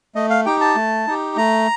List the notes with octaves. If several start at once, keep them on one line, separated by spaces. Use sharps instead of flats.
A3 D#5
F5
D#4 G4 G5
A5
A3
D#4 G4
A3 A#5